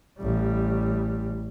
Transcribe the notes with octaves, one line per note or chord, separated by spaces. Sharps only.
A1 G3